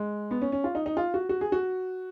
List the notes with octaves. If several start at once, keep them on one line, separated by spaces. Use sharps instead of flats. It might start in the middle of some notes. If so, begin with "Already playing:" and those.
Already playing: G#3
B3
C#4
C#4
F4
D#4
D#4
F4
F#4
F#4
G#4
F#4